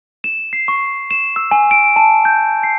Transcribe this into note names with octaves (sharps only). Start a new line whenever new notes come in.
E7
C7
C#6
E7
E6
G#5
D7
A5
G6
C7